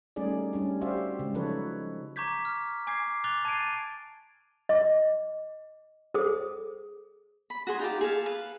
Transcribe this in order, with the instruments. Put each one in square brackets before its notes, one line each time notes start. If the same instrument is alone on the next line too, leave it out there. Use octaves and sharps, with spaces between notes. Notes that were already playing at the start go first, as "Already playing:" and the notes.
[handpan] G3 A3 C#4 D#4 G#4 D5
G3 C#4 D4
F#4 G4 C5 D5 E5 F5
C#3 G#3
F3 F#3 D#4 A4 B4 C#5
[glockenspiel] A#5 C#6 D6 G6 G#6 B6
F6
G#5 D6 G6 G#6 C7
D6 F#6 A6 F7 G7
A5 G#6 A6 C7 D7 D#7
[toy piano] D#5 D6
G#4 A4 C5 D#6
[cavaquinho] B5
F#4 G#4 C6
D#4 F4 G4
G#4 A4 F5
B4 F5